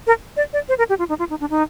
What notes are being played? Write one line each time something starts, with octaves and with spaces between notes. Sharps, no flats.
A#4
D5
D5
C5
A#4
G4
F4
D#4
F4
D#4
D4
D#4